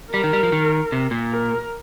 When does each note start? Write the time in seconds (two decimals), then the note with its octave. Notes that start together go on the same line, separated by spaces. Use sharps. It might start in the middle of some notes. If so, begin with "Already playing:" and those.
0.13 G3 A#4
0.24 D#3
0.33 G3
0.43 F3
0.52 D#3
0.92 C3
1.11 A#2
1.31 A#4